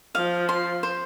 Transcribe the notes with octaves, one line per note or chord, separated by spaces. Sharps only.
F3 F5
C6
C5